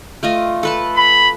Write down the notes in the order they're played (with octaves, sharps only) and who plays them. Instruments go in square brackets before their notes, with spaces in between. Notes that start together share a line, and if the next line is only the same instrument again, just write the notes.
[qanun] A3 F4 D#5
A4 B4 A5
[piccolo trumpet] B5